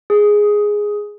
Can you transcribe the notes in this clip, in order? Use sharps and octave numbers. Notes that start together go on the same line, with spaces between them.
G#4